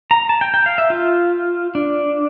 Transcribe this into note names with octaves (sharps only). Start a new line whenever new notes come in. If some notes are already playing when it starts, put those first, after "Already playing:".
A#5
A5
G5
G5
F5
E5
F4
D4